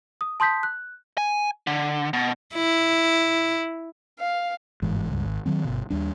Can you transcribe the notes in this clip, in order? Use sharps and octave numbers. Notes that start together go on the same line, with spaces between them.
D#6
A5 C6 D#6 G6 B6
F#6
G#5
D3
B2
E4
F5
G1 G#2 E3
C#2 G2
G#1
D#3 F#3 C4
G1 B2
D#2 G3 D4